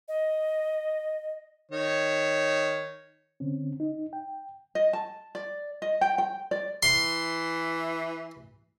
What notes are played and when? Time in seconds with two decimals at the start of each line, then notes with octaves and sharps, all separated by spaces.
0.08 D#5
1.71 D#3 C#5
3.40 D3 C4 C#4
3.80 D#4
4.13 G5
4.75 D#5
4.93 A5
5.35 D5
5.82 D#5
6.01 G5
6.18 G5
6.51 D5
6.83 E3 C6